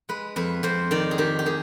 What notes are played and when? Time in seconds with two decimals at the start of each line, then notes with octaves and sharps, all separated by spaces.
0.09 G#3 B4
0.36 F2 B4
0.63 F2 C5
0.91 D#3 D5
1.11 G#4
1.18 D#3 G4
1.39 G4
1.46 D#3 G#4